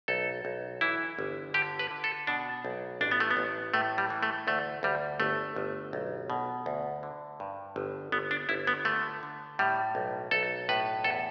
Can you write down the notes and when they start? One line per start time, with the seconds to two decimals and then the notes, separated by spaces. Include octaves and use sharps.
0.08 B1 A4
0.45 B1
0.81 E3 E4
1.19 G1
1.54 D3 G4
1.79 B4
1.91 D3
2.04 A4
2.27 B2 D4
2.65 B1
3.01 A1 D4
3.11 B3
3.20 A3
3.31 B3
3.37 A1
3.74 A2 A3
3.98 G3
4.10 E3
4.23 A3
4.47 D2 A3
4.83 D2 G3
5.20 G1 A3
5.56 G1
5.93 B1
6.30 B2
6.66 D2
7.03 D3
7.40 G2
7.76 G1
8.12 G1 B3
8.31 D4
8.49 G1 E4
8.67 B3
8.85 D3 A3
9.23 D3
9.59 A2 G3
9.95 B1
10.31 B1 A4
10.69 A2 B4
11.04 E2 A4